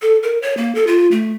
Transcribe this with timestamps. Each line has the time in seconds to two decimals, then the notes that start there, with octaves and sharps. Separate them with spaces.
0.02 A4
0.23 A#4
0.42 C#5
0.57 A#3
0.75 A4
0.87 F4
1.11 A3